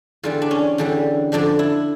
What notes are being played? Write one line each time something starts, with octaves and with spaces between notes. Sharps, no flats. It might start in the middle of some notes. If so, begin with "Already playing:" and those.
E2 D3 G3 F4
D4
C#4
E2 D3 G3
F2 D3 F3 D4
E4